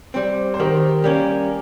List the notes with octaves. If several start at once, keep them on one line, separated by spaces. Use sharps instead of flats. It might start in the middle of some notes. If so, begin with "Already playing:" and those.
G3 C4
C5
D#3 G4 A#4
G3 A#3 C#4